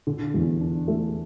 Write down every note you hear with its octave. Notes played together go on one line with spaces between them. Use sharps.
D3
E2
D4
A3